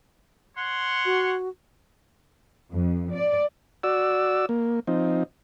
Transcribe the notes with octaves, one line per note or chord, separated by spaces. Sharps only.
C#5 F#5 C6
F#4
F2
D5
F#4 D5 E6
A#3
F3 C4 D#4